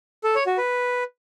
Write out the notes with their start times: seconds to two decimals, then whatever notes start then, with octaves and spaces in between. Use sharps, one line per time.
0.24 A4
0.35 C#5
0.46 F#4
0.58 B4